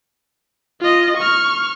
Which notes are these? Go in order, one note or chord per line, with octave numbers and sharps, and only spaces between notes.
F4 D#5
C#6 F6